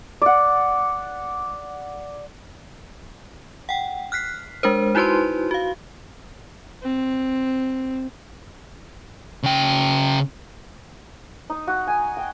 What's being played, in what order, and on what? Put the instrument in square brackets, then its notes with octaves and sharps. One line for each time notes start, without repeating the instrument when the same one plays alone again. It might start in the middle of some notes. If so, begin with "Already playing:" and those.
[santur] D5 F#5
[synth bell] F#5 G5
F6 F#6 B6 C7
G#3 D4 A#4 C5
D#4 E4 F#4 B4 C5 C6
F#4 F5
[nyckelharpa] C4
[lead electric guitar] C#3 G5
[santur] D#4
F#4
G#5
G5